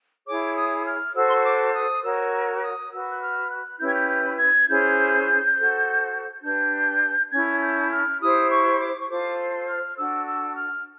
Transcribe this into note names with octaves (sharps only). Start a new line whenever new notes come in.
E4 G#4 C#5 D6
D#6
F6
F#4 A4 C5 E6
C6
C#6
D6
D#6
F#4 A#4 C#5 E6
E6
D#6
F#4 B4 E6
F#6
F6
F#6
C#4 E4 G4 B4 G6
G#6
G6
G6
G#6
C#4 E4 G#4 C5 G6
F#4 A4 C5
D4 G4 B4 G6
C#4 E4 A4 G#6
G6
F6
E4 G4 C5 D#6
C#6
D6
C#6
F4 A4 C5 D6
F6
D4 F#4 A4 E6
E6
F6